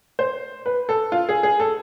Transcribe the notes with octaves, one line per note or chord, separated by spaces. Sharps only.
C5
B4
A4
F4
G#4
G#4
A4